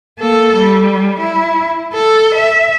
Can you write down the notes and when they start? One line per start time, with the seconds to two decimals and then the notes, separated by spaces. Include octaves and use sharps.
0.19 A#3 A4
0.55 G3
1.20 E4
1.94 A4
2.36 E5